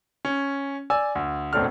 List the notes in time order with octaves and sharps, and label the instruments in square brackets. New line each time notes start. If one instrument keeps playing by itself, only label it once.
[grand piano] C#4
D5 G#5 E6
D2
E1 A2 C4 D4 A4 F6